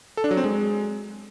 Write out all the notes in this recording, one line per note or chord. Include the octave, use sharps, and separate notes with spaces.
A4
D4
F#3
C4
G#3